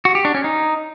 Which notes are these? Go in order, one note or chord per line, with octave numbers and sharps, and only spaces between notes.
F#4
G4
D4
C#4
D#4